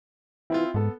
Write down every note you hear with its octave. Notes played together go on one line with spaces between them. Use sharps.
E3 C4 E4 F4
G#2 B3 A4